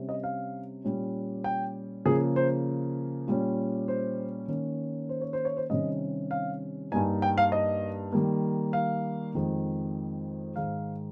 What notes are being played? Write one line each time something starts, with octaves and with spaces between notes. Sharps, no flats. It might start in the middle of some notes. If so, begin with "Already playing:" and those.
Already playing: C3 G3 C#4
D#5
F5
A#2 G3 C#4
G5
C#3 F3 A#3 G#4
C5
A#2 G3 C#4
C5
D#3 A#3 C#4
C5
C#5
C5
C#5
C5
C3 D#3 G3 C#4 D#5
F5
G2 G3 A#3 D#4 G#5
G5
F5
D#5
D#3 G3 A#3
F5
F2 D#3 G#3
G#2 D#3 G#3 D#4 F5